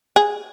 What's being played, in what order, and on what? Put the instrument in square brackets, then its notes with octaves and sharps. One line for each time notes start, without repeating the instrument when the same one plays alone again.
[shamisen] G#4